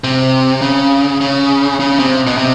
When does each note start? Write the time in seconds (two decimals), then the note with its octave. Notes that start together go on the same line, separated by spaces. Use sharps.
0.04 C3
0.61 C#3
1.21 C#3
1.80 C#3
1.99 C3
2.27 B2
2.37 C3